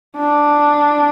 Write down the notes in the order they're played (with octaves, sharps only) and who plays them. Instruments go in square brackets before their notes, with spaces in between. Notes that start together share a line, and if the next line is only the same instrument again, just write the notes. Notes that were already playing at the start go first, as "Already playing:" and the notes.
[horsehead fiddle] D4